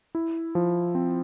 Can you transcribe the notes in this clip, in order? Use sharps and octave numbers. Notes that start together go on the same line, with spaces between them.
E4
F3
C4